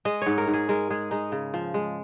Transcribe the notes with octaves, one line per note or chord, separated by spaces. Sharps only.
G#3 D#5
G#2 C#5
A#4
G#2
G#4
G#3 A#4
G#3 G#4
G#3 D#4
C#3
F3
G#3